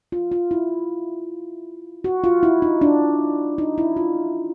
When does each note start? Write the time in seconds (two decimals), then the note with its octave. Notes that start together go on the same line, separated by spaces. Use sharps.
0.12 F4
0.32 F4
0.51 E4
2.04 F#4
2.24 F4
2.43 E4
2.62 D#4
2.81 D4
3.58 D#4
3.78 E4
3.97 F4